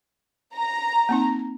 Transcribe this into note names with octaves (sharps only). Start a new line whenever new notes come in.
A#5
A#3 C4 D#4